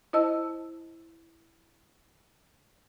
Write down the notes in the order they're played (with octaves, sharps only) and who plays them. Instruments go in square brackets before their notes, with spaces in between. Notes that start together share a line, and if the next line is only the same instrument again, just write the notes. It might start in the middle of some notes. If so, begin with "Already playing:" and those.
[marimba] E4 C5 D#5 A5 E6